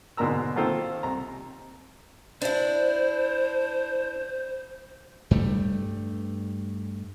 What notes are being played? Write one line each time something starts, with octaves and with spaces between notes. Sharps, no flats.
G#2 B2 D3 A#4 A#5 E6
D#3 A#3 C4 F4 A4
C2 A#5
D4 E4 C5
G2 G3 A3